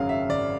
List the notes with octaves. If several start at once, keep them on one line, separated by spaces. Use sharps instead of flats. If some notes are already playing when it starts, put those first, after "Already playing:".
Already playing: G#1 F#2 C#3 F#3 F5
E5
G#1 D5